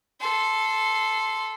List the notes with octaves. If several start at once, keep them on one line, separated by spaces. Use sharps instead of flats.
A4 C6